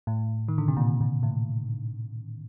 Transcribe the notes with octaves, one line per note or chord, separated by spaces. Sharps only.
A2
D#3
D3
C3
A#2
A#2
A2